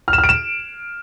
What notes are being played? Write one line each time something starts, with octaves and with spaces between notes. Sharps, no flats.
F6
E7
F6
D7
E7